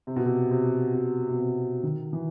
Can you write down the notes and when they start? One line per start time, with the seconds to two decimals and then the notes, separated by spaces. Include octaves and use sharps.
0.07 C3
0.16 B2
0.25 C3
0.51 C3
0.95 B2
1.29 B2
1.39 C3
1.83 D#3
2.13 E3